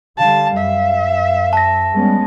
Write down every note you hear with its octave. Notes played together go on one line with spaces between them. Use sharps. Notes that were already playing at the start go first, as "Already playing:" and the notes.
D3 G3 F5 A5
F#2 E5
A5 A#6
G3 G#3 B3 C#4